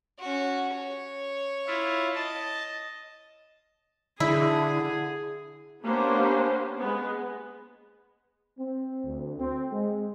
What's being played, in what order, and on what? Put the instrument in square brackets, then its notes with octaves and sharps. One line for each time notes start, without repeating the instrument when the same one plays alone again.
[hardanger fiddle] C#4 F#4
C#5
[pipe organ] E4 F4
[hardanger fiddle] D#5 [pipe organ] A5
[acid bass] D3 [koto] E4 [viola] G#4
[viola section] A#3 B3 C#4 D4 G4 C5
G#3 B3
[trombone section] C4
D2
C4
G#3